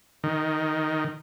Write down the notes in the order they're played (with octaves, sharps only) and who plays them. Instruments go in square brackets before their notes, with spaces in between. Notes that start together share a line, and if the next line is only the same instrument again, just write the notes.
[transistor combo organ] D#3